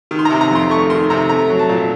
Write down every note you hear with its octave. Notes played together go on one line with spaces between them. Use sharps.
D#3
C6
C3 A#5
A#5
F2 C6
A3 C#6
D#3 C6
C3 A#5
A3 A#5
F#3
A5
A#2